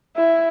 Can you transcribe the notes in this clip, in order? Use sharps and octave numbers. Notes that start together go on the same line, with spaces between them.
E4